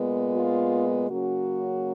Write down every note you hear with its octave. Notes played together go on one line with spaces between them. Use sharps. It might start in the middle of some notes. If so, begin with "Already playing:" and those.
Already playing: A#2 G#3 B3
F4
C#3 F#3 A#3 C#4 F#4